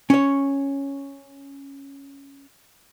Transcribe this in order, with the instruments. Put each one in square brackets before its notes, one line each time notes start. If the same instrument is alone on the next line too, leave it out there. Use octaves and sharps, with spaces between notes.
[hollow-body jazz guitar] C#4 C#5